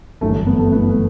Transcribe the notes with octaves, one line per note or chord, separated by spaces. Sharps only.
G1 F#2 E3 A3
A3
B3
A3
G1 F#2 E3 B3
A3